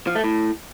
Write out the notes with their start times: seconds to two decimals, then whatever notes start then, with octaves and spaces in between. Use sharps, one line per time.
0.07 F3
0.15 A3
0.24 A2